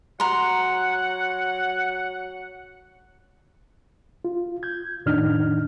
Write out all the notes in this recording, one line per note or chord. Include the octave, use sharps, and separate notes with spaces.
F#3 F#5 A#5 C6
F4
G6 G#6
F2 A2 D#3 D4 D#4 F6